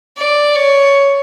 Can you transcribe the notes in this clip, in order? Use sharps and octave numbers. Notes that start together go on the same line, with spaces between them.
D5
C#5